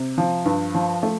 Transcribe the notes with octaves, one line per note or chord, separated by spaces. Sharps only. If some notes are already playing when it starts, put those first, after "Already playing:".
Already playing: C3
F3
G2
F3
A3